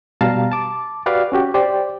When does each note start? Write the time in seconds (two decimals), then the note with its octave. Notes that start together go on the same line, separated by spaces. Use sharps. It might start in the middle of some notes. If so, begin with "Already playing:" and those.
0.21 B2 G3 F5 A5 A#5
0.52 A5 D6
1.06 F#4 G4 B4 D5 F5
1.32 C#4 F#4 G4
1.54 G4 C5 D5 G5